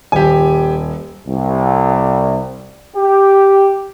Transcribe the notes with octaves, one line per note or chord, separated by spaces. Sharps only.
D#1 G4 G#5
C2
G4